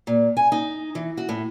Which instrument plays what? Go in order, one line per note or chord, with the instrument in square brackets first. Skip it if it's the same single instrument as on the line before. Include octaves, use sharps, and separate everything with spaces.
[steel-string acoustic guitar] A#2
G#5
D#4
E3
F#4
A2